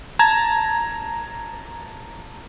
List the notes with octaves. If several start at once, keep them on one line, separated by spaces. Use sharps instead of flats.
A5 A#5 G#6